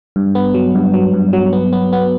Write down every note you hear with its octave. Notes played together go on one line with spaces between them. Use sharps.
G2
B3
F#3
G2
F#3
G2
F#3
B3
B3
B3